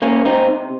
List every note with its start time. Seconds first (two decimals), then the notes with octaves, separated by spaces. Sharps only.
0.02 C2 A#3 C#4
0.25 C3 C4 D#4